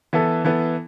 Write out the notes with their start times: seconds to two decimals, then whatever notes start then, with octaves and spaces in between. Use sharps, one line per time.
0.13 E3 B3 E4 A4
0.45 E3 B3 E4 A4